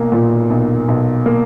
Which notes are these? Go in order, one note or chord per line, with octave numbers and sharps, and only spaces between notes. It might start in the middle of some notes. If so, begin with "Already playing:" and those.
Already playing: B1 A#3
A#2
B1
B1
A#3